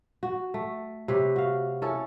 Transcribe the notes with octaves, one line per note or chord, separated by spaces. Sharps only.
F#4
A3
C3 B4 C#5
F#4 F5
C#4 E4 A4